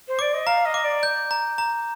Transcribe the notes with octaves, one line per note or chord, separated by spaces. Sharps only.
C5
D5 D6
D#5
F5 A#5
D#5
D6
D5
G6
A#5
A#5